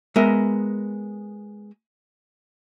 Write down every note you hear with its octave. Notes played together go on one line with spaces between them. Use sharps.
G#3 B3 A#4 E5